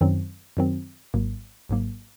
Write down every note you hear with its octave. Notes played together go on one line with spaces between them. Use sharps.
F#2 D#3 F#3 C4
F#2 D#3 F#3 C4
G#1 G#2 F#3 A#3
G#1 G#2 F#3 A#3